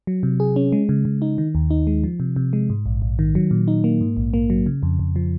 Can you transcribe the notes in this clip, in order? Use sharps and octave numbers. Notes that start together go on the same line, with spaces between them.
F#3
C3
G#4
C#4
G#3
C#3
C#3
D#4
D#3
D#2
D#4
G#3
F3
C3
C3
G#3
G#2
A#1
A#1
D#3
F#3
A#2
D#4
A#3
G#2
A#1
A#3
F#3
C#3
F2
F2
F3